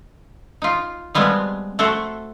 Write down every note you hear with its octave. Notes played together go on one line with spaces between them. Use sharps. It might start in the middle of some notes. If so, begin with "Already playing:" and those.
D#4 F4
F3 G3 G#3 B3 C4
A3 F#4 A4 C5